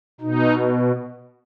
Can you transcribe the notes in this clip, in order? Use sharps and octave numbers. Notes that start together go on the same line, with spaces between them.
B2 D#4